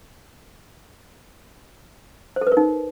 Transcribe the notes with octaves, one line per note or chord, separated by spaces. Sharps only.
C5
A4
B4
A#4
D#4